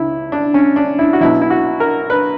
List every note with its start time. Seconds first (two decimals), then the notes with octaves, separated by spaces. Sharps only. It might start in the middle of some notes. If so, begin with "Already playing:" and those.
Already playing: C#2 E4
0.32 D4
0.54 C#4
0.76 D4
0.99 E4
1.13 F#4
1.20 B1 B2 F#3 E4
1.41 E4
1.50 F#4
1.80 A#4
2.10 B4